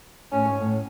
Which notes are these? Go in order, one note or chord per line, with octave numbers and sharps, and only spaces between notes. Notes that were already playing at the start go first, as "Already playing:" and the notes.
A2 C#4
G#2
A2